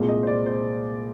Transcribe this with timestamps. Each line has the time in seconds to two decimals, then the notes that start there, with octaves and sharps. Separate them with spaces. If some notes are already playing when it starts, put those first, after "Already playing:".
Already playing: C2 A#2 G#3
0.09 D#5
0.23 C5
0.27 D5
0.46 C5